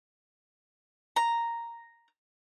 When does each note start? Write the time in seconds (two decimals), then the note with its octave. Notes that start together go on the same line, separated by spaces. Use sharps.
1.16 A#5